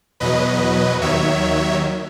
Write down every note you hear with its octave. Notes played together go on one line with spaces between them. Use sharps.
E2 B2 F#3 B4 D#5
D#2 D#3 F#3 C#5 E5